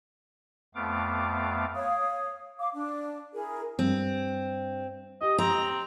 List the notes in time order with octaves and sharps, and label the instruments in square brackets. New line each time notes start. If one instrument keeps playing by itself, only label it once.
[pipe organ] F2 A3 B3 F5 D6
[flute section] C#5 F5 D#6
F5 D6
D4
E4 G#4 A#4
[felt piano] G2 [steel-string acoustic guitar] C4
[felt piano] G4 [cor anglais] D#5
[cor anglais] C4 [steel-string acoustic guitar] A#5